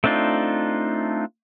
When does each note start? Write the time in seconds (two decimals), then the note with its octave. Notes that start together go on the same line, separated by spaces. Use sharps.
0.04 A3 C4 D4 D#4 F4